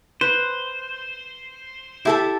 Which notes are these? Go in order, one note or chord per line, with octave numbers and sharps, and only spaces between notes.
B4 C5
E4 G4 A4 E5 A5